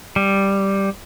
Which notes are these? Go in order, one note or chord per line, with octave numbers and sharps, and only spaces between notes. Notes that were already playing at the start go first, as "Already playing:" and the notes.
G3